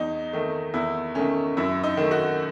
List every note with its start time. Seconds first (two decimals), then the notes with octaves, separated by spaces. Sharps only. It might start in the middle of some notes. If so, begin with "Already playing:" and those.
Already playing: E2 D#4
0.33 D#3 A3
0.74 E2 E4
1.15 D#3 A3 C#4
1.57 F#2 E4
1.83 D#4
1.97 D#3 A3
2.11 F#4